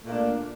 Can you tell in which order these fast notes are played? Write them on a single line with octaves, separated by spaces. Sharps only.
A3 A#2 A#3 D4